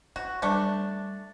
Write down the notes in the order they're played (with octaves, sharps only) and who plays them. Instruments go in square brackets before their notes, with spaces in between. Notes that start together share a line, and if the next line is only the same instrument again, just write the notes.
[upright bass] F4 [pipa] F#4
[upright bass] G3 [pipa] A3 D4